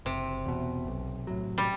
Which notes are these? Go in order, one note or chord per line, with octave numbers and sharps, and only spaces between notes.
F#1 C3
E2 B2
B1
A2 F#3
G3